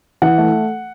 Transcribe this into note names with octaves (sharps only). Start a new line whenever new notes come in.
E3 F#5
A3